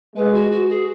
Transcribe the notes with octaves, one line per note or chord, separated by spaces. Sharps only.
G#3 B4
F#4
F#4
G#4